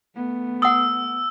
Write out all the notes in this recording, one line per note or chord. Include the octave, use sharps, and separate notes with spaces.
A3 B3
F#5 D#6 E6